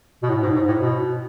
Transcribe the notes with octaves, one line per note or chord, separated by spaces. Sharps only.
B2
A2
G#2
G#2
A2
B2